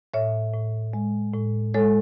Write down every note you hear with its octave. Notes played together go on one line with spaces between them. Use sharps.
A2 C#5 E5
A2
G#3
A2
G#3 A4 C#5